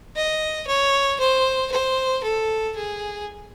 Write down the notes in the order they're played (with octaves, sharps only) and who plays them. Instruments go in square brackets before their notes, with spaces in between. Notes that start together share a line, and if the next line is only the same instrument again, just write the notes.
[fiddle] D#5
C#5
C5
C5
A4
G#4